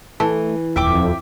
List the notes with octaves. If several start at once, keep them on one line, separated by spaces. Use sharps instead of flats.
E3 A3
D#1 F2 E5 G5 D6